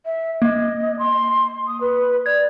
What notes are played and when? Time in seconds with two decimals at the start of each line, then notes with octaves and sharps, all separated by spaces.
0.06 E5
0.42 A#3 D#5
0.99 C6
1.67 D#6
1.81 B4
2.26 D5 G#6